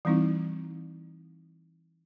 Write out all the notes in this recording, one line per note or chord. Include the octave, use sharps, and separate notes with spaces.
E3 G3 C4 D#4 E4